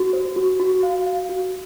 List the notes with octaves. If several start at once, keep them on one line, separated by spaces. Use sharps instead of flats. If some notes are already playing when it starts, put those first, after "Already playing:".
Already playing: F#4
C5
F#4
F#4
F5
F5
F#4